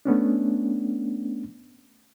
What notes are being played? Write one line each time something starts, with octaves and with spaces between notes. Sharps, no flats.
A3 B3 C#4 D4